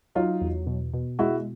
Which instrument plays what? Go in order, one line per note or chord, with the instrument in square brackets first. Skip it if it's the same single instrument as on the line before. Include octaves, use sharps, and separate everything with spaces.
[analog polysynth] F#3 [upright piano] D#4 F4
[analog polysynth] E2
B2
B2
[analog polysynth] G#3 [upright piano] E4 F#4